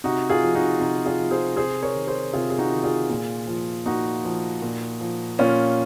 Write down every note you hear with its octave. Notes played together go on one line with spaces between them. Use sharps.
C3 D#4 F#4
F4 G#4
F3
D#4 F#4
C3 D#4 F#4
F4 G#4
F3
G#4 C5
C3 G#4 C5
A#4 C#5
D#3
G#4 C5
C3 F4 G#4
G#4
D#4 F#4
D#3
F4 G#4
A#2
F3
A#2 D#4 F#4
F3
A#2
F3
A#2 C#4 F4